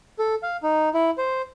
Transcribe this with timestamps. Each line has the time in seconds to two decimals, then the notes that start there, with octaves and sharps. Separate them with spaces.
0.19 A4
0.43 F5
0.63 D#4
0.94 E4
1.18 C5